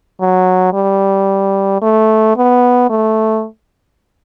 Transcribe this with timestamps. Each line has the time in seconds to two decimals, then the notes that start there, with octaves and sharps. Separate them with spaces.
0.20 F#3
0.73 G3
1.82 A3
2.37 B3
2.90 A3